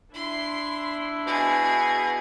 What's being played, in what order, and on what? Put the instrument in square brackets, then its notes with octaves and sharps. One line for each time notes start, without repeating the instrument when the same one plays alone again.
[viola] D4 E4 [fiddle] C6
[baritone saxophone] B2 [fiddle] G#4